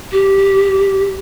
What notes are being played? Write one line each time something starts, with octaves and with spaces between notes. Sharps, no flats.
G4